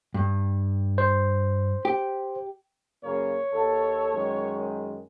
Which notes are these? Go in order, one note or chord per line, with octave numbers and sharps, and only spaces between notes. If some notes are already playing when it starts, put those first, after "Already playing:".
G2
C5
G4
F#2 C#3 A#3 C#5
D#2 A4
F#2 D#3 G#3